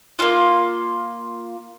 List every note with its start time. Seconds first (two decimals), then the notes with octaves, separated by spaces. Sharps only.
0.19 A#3 C#4 F4